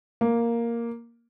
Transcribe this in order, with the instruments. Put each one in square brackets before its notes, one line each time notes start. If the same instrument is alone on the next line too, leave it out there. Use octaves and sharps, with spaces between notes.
[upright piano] A#3